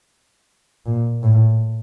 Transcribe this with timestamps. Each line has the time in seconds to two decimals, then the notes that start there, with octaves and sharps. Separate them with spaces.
0.86 A#2
1.24 A2